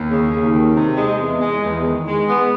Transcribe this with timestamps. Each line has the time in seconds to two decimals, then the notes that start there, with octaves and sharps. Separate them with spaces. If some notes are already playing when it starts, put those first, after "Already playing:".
Already playing: D#2
0.09 C#3
0.31 D#2
0.54 D#3
0.76 C3
0.96 G#3
1.18 E2
1.41 G#3
1.63 E2
1.84 D#3
2.07 G#3
2.28 B3